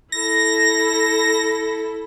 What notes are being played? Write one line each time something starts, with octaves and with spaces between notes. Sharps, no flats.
E4 A4 A#6